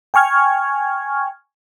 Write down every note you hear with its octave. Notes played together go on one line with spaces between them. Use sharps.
G5 G#5 C#6 F6 G#6